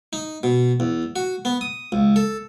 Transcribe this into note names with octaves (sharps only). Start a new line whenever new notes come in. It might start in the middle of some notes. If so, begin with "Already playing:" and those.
D#4
B2
E2
F#4
B3
D#6
C#2
A4